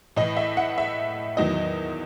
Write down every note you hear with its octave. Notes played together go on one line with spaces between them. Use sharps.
A2 E3 D#5
E5
F#5
E5
E2 D#3 F#3 D#5